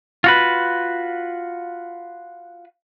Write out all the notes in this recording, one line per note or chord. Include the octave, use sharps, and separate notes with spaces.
F4 F#4 B4